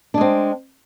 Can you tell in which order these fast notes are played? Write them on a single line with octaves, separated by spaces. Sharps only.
D4 G#3 C4